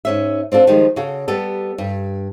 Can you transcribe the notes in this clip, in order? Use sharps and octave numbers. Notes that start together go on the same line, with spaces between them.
G#2 C#4 E5
C4 D4 F4 A4
D#3 F3 G3 G#3
C#3 F#4 A4
G3 B3 G4 A4
G2